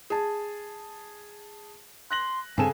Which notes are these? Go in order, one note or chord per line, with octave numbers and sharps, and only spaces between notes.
G#4 A5
C6 F#6 A#6 F#7
G2 C#3 C4 A4 G#5 E7